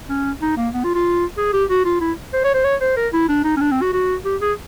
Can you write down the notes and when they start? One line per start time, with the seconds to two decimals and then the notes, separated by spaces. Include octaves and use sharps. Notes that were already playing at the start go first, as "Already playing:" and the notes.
0.09 C#4
0.42 D#4
0.57 A#3
0.74 B3
0.84 F4
0.95 F4
1.37 G#4
1.53 G4
1.70 F#4
1.85 F4
2.01 E4
2.33 C5
2.44 C#5
2.54 C5
2.64 C#5
2.81 C5
2.97 A#4
3.13 E4
3.29 D4
3.44 D#4
3.57 C#4
3.61 D4
3.71 C4
3.82 F#4
3.93 F#4
4.25 G4
4.41 G#4